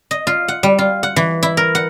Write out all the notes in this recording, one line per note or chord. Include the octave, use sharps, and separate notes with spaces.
D#5
F4
F#5
G3
F4
F#5
E3
E4
A#4
F#5